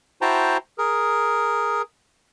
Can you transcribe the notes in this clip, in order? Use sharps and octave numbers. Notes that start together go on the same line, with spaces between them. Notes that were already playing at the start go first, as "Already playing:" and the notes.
E4 F#4 C5 G5 A5 A#5
G#4 A#4